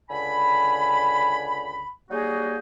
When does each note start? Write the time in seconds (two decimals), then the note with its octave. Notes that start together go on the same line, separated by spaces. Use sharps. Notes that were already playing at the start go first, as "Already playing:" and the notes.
0.10 C#2 D3 G#5 B5
2.11 F#3 G3 A#3 D#4 F#4 G#4